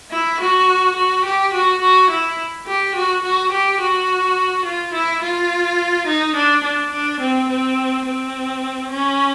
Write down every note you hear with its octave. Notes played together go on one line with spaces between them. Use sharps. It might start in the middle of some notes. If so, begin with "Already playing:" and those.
E4
F#4
F#4
G4
F#4
F#4
E4
G4
F#4
F#4
G4
F#4
F4
E4
F4
D#4
D4
D4
D4
C4
C4
C4
C#4